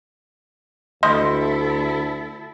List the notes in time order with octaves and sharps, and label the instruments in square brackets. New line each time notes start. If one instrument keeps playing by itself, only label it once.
[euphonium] D2 [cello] E4 A4 [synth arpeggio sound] D#5 [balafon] C6